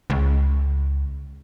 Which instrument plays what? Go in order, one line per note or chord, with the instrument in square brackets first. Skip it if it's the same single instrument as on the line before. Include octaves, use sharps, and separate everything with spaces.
[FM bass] C#2